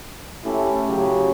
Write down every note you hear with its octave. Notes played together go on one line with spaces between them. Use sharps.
A3 C#4 E4 G4
C#3 F#3 G4